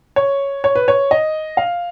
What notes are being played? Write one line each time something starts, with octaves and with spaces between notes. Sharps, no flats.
C#5
C#5
B4
C#5
D#5
F5